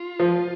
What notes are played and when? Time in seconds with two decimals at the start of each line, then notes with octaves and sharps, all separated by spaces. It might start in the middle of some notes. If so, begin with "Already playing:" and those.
Already playing: F4
0.20 F3